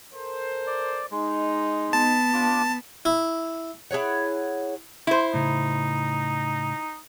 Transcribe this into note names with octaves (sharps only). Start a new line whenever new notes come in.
A4 A#4 C5
D5
G#3 D#4
B3 A5
D4 F4 D6
E4
E4 G#4 C#5 F#5
E4 C5 C6
A2 C#3 D#4